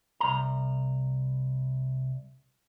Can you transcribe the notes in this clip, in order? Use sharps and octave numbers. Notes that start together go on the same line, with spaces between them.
C2 A#5